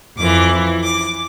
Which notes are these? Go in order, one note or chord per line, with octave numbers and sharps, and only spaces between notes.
F2 E3 D6
D6